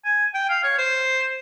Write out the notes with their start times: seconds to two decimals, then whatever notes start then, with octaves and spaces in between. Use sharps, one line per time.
0.05 G#5
0.34 G5
0.49 F5
0.64 C#5
0.78 C5